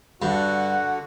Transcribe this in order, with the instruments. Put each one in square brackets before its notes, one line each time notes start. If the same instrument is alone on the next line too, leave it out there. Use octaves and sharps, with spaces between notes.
[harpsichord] G2 [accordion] D3 F#4